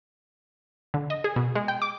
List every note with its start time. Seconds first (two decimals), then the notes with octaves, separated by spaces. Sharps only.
0.94 D3
1.10 D#5
1.24 G#4
1.36 B2
1.55 G#3
1.68 G5
1.82 D6